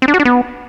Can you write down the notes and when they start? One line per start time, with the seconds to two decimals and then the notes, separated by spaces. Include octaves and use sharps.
0.02 C4
0.08 D4
0.14 F#4
0.20 D4
0.25 B3